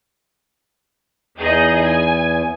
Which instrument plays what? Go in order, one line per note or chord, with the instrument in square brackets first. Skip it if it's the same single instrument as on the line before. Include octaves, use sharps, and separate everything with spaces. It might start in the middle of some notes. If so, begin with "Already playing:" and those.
[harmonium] E2 [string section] D#4 G#4 D#5
[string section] G#5